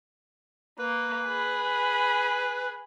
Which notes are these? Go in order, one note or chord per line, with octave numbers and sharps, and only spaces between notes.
A#3 B4
G#4 B5